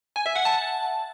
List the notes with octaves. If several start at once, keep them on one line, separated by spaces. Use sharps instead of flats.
G#5
E5
F#5
A5